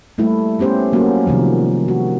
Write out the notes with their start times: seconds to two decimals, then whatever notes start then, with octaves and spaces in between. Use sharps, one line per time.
0.18 G3 A3 A#3 E4
0.58 A#3 B3 C#4 G4 C5
0.93 F#3 A#3 C#4 F#4
1.26 C3 D#3 F3 G3
1.88 F#4